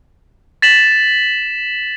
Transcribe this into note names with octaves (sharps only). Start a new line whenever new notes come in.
A6 B6 E7 F#7